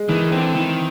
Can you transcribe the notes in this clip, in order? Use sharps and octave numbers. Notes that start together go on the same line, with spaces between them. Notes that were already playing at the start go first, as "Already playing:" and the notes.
Already playing: G#3
D#3 E3
D3 C4
D#3 E3